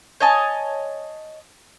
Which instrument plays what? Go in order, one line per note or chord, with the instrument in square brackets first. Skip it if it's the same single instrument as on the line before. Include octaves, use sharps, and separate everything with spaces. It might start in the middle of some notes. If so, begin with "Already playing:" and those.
[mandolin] C#5 D#5 G#5 A5